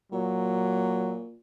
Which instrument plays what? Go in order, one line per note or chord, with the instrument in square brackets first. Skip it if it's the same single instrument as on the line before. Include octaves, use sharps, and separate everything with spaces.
[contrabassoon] A#2 [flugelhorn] F#3